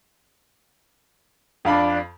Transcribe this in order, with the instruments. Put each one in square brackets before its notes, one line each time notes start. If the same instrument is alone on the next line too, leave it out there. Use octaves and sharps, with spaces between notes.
[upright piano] F2 F5 B5 [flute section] D4